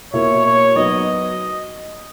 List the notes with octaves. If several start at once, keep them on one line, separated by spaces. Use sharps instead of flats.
B2 A#3 E4 C#5
C#5
F#3 B3 D#4 D#5